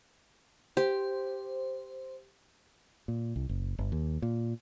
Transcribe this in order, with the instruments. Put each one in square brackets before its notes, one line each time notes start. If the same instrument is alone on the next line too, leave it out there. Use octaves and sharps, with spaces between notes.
[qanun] G4 [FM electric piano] C5
[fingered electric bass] A#2
C2
F#1
G1
D#2
A#2